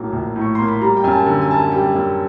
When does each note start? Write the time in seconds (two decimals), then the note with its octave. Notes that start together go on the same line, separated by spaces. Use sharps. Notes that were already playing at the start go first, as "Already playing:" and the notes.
Already playing: A#1 A2 F#3 A#3
0.13 A#1
0.36 A2
0.42 C#6
0.55 A#3 C6
0.68 B5
0.81 G3 A#5
0.97 G5
1.04 F#2 G#5
1.11 A5
1.26 D3
1.42 G#5
1.49 F#2 A5
1.60 G#5
1.72 G3 G5
1.95 F#2